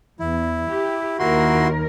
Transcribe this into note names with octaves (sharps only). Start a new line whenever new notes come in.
E2 E4
G4
D#2 E4 F#4 A#4 C6